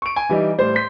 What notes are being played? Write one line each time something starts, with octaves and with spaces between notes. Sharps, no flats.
C#6 D7
G#5
E3 G3 D#4
A2 G3 C5 D5
C6 G6 B6